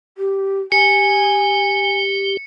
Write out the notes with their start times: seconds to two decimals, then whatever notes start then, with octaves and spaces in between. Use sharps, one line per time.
0.18 G4
0.72 G4 G#5 C#7